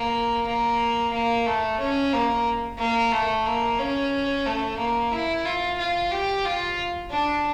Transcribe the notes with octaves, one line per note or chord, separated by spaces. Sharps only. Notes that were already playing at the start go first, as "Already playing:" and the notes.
Already playing: A#3
A#3
A#3
A3
C#4
A#3
A#3
A3
A#3
C#4
A3
A#3
E4
F4
F4
G4
F4
D4